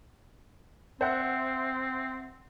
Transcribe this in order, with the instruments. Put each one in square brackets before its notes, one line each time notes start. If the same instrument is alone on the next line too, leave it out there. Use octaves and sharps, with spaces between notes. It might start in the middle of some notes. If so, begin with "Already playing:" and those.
[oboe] C4 [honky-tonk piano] C5 E5 F#5